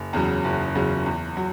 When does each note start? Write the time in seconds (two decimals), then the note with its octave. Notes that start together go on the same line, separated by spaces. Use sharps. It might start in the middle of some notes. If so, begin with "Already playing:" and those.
Already playing: F#1
0.13 E2 C#3 F#3
0.44 F#1
0.75 E2 C#3 F#3
1.06 E2
1.37 F#3